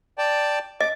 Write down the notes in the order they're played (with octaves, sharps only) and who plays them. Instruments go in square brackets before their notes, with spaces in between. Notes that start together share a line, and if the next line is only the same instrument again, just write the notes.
[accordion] D5 G5 A5
[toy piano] D#5 [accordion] D6